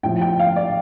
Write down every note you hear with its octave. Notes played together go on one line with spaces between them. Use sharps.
A2 F3 G5
G5
F5
D5